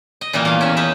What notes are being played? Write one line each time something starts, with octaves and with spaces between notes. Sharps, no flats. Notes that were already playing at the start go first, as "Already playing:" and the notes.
D#5
A#2 E3 G3 A#3
E2 F5
C#4 E5
D#4 B4 E5